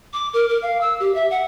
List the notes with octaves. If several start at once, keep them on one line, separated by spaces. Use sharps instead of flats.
D6
A#4
A#4
F5
E6
G4
E5
F#5